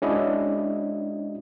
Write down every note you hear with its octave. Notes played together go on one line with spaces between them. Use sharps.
G#3 C#4 D4 E4 F#4 D#5